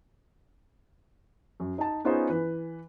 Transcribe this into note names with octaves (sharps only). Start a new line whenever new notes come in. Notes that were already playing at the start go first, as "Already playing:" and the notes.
F#2
D#4 A5
B3 C#4 D#4 F4 G#4 C5
E3 B4